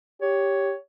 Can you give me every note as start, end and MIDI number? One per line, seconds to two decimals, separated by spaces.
0.21 0.74 67
0.21 0.77 73